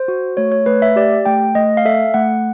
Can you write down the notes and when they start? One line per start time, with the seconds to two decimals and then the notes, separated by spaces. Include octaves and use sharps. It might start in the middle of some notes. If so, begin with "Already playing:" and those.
Already playing: C5
0.08 F#4
0.37 A3 C#5
0.52 C#5
0.66 A3 B4
0.82 E5
0.96 G4 D5
1.26 A3 G5
1.55 A3 D#5
1.77 F5
1.85 A4 E5
2.14 A3 F#5